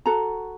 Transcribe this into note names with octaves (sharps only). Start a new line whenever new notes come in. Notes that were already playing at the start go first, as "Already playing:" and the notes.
F#4 A4 A#5